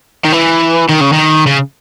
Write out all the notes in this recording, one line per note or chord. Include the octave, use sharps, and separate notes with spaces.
D#3
E3
D#3
C#3
D#3
C#3